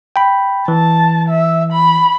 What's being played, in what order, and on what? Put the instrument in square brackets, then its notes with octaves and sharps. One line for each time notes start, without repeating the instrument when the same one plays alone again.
[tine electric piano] G5 B5
[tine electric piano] E3 [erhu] A5
[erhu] E5
B5